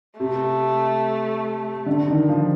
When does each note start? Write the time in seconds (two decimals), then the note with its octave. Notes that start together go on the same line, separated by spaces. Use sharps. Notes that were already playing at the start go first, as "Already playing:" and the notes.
0.19 C3 A3
1.86 D3
2.08 D#3
2.29 F3